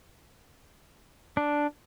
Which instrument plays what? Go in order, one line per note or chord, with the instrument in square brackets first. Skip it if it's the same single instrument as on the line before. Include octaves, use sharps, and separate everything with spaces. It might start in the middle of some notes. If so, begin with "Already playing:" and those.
[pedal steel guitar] D4